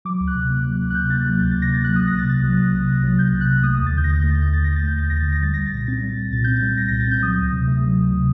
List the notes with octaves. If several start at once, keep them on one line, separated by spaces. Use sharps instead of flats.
F#3 D6
D2
F#6
C3
A#3
F#3
D2
F#6
C3 G6
A#3 A6
F#3 F#6
D2 G6
C3 A6
A#6
A#3 A6
F#3 F#6
C2 D#6
A#6
C3 A6
C2 A6
F#3
C2
C3
C2
F#3
C2 G6
C3
F#6
C2
A3 D#6
D#2 D#6
A6
D3 G6
A#6
D#2 A6
A3 G6
A6
D#2 G6
D3 A6
D#2 A#6
A6
A3 G6
D#2 A6
D3 A#6
A6
D#2 A#6
G3 A6
C2 A#6
A6
A#2 A#6
C4 A6
G3
C2
A#2 A6
C4 G6
A6
G3
C2 A#6
A#2 A#6
A6
C4 G6
F#3 D#6
D2
C3
A3
F#3
D2
C3